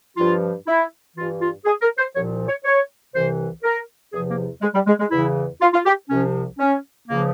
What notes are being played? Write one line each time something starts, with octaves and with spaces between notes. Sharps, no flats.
G2 F3 F4
E4
G2 E3 F4
F4
G#4
A#4
C5
C2 A#2 F3 C#5
C#5
C#5
C2 C3 E3 C5
A#4
E2 C3 F3 G#4
A#3
G#3
G3
G#3
G#3
E2 C#3 E3 E4
F4
F4
G4
C2 C3 F3 C#4
C#4
C#2 C#3 F3 A#3